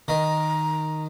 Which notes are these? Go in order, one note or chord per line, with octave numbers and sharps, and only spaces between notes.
D#3 A#5